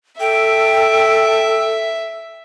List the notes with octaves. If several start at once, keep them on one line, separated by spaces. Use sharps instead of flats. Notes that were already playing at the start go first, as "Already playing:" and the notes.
A4 E5 G5